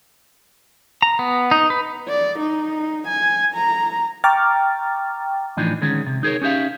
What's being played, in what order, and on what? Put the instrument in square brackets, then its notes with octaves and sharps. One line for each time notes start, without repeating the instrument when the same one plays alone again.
[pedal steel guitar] A#5
B3
D#4
B4
[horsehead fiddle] D5
D#4
G#5
A#5
[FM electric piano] G5 A#5 C#6 D6 F6 A6
[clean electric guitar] A2 E3 F3 D4 D#4
D3 D#3 G#3 C#4
C3
D#4 G#4 A#4 C#5
C#4 D#4 G4 E5 F5